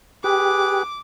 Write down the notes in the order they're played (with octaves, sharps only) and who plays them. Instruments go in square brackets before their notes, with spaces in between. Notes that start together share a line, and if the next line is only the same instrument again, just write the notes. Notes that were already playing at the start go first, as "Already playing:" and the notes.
[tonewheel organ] G4 [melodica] G#4 B4 [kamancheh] D6